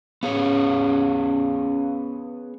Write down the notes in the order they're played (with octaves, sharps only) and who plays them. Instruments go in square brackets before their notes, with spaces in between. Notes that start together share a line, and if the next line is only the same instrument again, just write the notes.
[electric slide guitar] B3 G#4 C#5 [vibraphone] C#4 F5